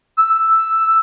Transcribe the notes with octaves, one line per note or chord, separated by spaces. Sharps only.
E6